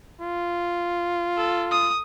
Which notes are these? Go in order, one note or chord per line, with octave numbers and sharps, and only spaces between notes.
F4
A4
D#6